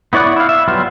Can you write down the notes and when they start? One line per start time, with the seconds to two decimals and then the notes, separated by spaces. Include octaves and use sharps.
0.13 B3 E4 C#5 D5 F#5
0.36 E4 F5
0.49 E5
0.68 F#3 G3 B3 F4 F6